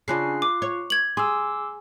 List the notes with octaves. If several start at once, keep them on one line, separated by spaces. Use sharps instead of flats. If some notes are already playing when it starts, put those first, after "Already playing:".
C#3 C#4 D4 F4 F#6 C7
D6
C#5
G#6 F#7
G#4 C6 D6 E6